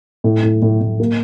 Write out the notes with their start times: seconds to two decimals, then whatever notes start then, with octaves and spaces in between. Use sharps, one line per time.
0.24 A2
0.43 A2
0.62 A2
0.81 A2
1.00 A#3